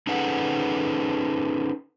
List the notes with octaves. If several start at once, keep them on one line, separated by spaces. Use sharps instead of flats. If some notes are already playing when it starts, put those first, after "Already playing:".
C#4 D#4 G#4 A4 B4 F#5